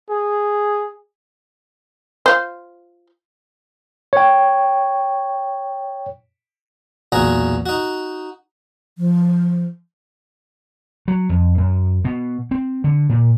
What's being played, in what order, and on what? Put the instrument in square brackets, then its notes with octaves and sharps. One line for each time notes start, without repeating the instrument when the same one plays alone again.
[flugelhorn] G#4
[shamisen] F4 C5
[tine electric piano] C#5 G5
[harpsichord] B1 E2 A#2 F#4 G#4 A#5
D#4 F#4
[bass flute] F3
[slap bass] F#3
F2
F#2
B2
C4
D3
A#2